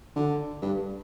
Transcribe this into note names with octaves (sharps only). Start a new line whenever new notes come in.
D3
G2